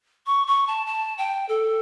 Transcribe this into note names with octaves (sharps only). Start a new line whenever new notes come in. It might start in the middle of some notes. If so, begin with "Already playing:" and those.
C#6
C#6
A5
A5
G5
A4